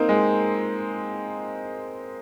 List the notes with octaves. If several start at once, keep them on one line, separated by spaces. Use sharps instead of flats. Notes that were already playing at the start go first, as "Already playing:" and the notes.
Already playing: A#3 C4 D#4
G#3